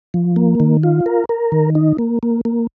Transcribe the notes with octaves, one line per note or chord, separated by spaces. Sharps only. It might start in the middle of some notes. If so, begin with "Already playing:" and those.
F3
A#3
D#3
F4
A#4
A#4
D#3
D#4
A#3
A#3
A#3